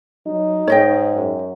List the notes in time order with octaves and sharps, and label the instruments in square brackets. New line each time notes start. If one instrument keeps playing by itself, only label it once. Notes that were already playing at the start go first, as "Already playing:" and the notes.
[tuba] F#3 [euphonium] D#4
[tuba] G#2 [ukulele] C#5 D#5 G5
[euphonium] F#2